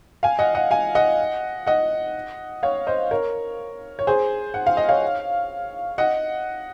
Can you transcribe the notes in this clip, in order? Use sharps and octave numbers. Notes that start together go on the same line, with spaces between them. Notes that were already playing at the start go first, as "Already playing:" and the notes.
F5 G#5
D#5 F#5
D#5 F#5
F5 G#5
D#5 F#5
D#5 F#5
C#5 F5
C5 D#5
A#4 C#5
C#5
G#4 C5
F#5
F5
D#5
C#5 F5
D#5 F#5